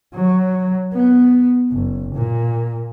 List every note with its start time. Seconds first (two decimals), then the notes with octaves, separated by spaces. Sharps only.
0.14 F#3
0.93 B3
1.72 F#1
2.15 A#2